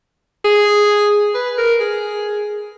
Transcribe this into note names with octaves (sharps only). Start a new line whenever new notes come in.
G#4
B4
A#4
G#4